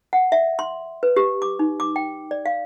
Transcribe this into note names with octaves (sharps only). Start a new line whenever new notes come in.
F#5
E5
C6
B4
G4
D6
D#4
D6
G5
D5
F5